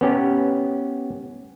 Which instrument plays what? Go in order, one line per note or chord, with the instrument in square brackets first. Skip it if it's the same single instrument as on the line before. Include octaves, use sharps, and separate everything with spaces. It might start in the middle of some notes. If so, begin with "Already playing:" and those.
[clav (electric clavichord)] B3 C#4 G4